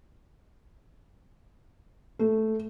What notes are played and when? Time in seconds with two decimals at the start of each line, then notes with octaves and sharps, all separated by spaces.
2.19 A3